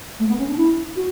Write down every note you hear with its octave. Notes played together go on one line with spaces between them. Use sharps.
A3
B3
C#4
D4
E4
F#4